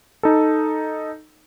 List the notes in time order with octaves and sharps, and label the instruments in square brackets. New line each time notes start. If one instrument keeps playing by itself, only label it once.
[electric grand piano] D#4 A4